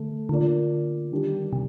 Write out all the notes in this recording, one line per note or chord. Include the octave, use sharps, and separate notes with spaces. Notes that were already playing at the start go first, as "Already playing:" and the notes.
Already playing: D3 A3 A4
D3 A#3 D4 F4 A#4 D5
D#3 G3 D4 G4
C3